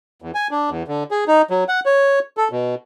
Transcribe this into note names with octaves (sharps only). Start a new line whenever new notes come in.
E2
G#5
D4
E2
D3
G#4
D#4
F#3
F#5
C#5
A4
B2